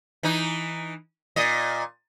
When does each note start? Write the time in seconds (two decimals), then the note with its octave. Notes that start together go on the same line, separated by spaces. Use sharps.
0.23 E3 D#4
1.36 A#2 D#5